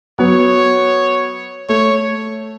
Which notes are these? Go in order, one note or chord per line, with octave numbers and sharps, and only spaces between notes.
F#3 B3 C#5
A3 C#5